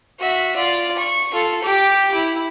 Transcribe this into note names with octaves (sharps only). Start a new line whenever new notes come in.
F#4 E5
F4 D5
C#6
F4 A4
G4 D6
E4